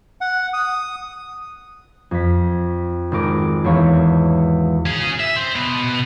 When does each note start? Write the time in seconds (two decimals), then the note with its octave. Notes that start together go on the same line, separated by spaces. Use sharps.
0.21 F#5
0.53 D#6
2.11 F2 B6
3.12 G#1 A#4 D6 D#7
3.64 E2 A#3 B3 C#5 F5
4.86 C#4 G#4
5.20 E5
5.36 C4
5.56 B2 B3